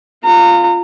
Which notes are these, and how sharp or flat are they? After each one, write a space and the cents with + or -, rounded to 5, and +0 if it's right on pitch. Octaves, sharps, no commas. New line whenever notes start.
F4 +0 A#5 -30